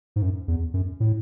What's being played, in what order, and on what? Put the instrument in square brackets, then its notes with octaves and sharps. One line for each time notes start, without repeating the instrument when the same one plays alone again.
[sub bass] G#2
F#2
E2
F#2
A2